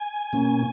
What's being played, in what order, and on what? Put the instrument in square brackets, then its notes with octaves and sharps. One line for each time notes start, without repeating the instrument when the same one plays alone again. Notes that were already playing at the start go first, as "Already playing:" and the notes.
Already playing: [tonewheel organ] G#5
B2 A#3 C#4